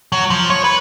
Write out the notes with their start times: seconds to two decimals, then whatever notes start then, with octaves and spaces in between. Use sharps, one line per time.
0.12 F#3
0.30 F3
0.50 C#5
0.64 B4